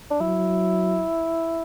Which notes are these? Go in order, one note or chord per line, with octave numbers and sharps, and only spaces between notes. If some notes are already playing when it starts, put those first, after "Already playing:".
D4
F#3 E4